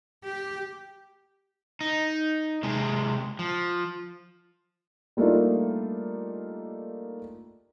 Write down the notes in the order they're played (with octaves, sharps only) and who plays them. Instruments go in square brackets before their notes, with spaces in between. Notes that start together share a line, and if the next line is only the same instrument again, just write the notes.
[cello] G4
[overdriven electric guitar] D#4
C3 G#3
F3
[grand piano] G3 A3 A#3 D4 D#4 F4